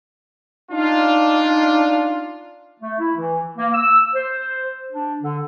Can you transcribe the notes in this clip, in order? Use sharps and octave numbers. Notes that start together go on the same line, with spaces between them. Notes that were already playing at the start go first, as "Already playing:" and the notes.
D4 D#4 F4
A3
E4
E3
A#3
E6
C5
D4
D3